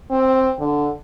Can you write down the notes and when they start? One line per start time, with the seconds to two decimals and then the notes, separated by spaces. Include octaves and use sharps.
0.11 C4
0.59 D3